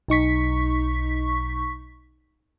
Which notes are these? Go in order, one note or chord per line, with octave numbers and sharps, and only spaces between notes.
B1 D#4 C#6 B6